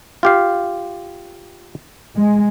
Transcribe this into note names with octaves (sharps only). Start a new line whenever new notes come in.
F4 G4 F5
G#3